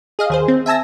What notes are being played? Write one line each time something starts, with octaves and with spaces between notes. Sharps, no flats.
G#4 D#5 F5
D#2 G#4 C5
C4
E5 G#5 A5 E6 A#6